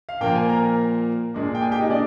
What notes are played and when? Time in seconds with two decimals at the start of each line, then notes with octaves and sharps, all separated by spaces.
0.09 F5
0.21 A#2 F3 A#3 G5
0.35 G#5
0.49 A#4 A#5
1.34 A#2 G#3 D4
1.55 G5
1.62 G#4 G#5
1.71 G4 G5
1.81 D#4 D#5
1.90 D4 D5